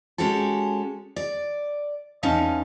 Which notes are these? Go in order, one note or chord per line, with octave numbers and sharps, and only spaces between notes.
G#3 C#4 F#4 G4 A4
D5
E2 C#4 D#4 F5 A5